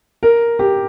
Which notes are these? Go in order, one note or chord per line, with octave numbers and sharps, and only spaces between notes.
A#4
G4